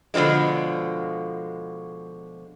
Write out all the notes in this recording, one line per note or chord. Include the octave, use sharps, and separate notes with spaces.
B2 D3 D#3 F3 G#3